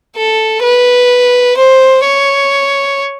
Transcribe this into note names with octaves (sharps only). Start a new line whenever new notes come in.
A4
B4
C5
C#5